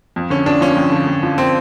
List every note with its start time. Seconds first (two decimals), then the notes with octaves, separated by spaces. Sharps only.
0.16 F2
0.30 D3 C#4
0.46 F2 D4
0.61 F3 C#4
0.77 F2
0.92 D3
1.07 F2
1.23 F3
1.38 C4